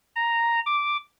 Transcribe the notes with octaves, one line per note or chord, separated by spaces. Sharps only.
A#5
D6